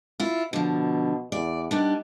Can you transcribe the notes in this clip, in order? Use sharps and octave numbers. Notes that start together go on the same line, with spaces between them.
E4 F4
B2 D3 F3
E2 D5
G3 B3 D4 D#4